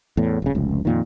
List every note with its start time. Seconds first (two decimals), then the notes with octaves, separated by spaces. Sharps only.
0.17 E2 A2
0.42 D#1 C#3
0.55 F1 C#2
0.85 F2 A#2 D#3